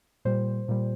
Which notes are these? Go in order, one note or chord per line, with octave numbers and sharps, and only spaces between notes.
A#2 G3 C5
A#2 G3